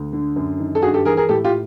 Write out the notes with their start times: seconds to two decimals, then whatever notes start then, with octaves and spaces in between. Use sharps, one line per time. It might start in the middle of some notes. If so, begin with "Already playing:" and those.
Already playing: D2
0.13 D3
0.36 F#2
0.59 D#3
0.75 A4
0.82 G2 F#4 G#4
0.94 G4 A4
1.05 E3 G#4 A#4
1.17 G#4 A#4
1.29 A2 G4 A4
1.44 F4 G4